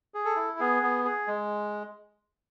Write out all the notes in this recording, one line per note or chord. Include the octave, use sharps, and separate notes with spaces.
G#4
A4
E4
B3 G#4
B3
G#4
G#3